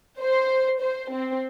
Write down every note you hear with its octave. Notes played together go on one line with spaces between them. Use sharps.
C5
C5
C4